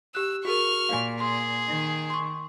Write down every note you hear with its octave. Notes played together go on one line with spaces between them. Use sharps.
G4 E6 F#6
F#4 G#4 A#4 C#6 F6
A#2 F5 G#5
G#4 C6
D#3
C6 C#6